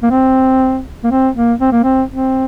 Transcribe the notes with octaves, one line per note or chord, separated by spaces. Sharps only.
A#3
C4
A#3
C4
A#3
C4
A#3
C4
C4